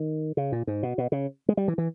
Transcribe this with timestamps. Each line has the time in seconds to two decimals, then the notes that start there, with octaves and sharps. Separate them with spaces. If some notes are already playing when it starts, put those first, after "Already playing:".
Already playing: D#3
0.37 C#3
0.52 A#2
0.67 G#2
0.83 B2
0.98 B2
1.12 C#3
1.49 G#3
1.57 G3
1.68 E3
1.78 E3